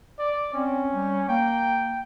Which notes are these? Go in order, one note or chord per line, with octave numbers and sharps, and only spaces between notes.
D5
C4 C#4
G3
A#3 G5